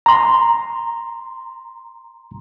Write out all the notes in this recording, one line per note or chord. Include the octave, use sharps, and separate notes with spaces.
A#5 C6